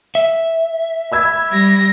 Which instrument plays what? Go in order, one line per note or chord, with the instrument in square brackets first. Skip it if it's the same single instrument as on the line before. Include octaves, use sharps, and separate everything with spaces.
[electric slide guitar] E5
[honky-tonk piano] B5 E6 G#6
[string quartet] G3 A#6